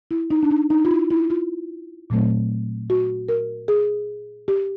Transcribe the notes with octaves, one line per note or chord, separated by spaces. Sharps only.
E4
D#4
D4
D#4
D#4
F4
E4
E4
F4
A#2 F#3 A3 C4
F#4
A#4
G#4
G4